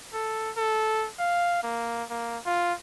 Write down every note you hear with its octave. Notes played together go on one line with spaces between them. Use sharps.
A4
A4
F5
A#3
A#3
F4